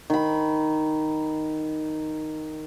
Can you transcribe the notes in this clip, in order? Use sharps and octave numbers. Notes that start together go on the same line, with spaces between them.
D#3 B5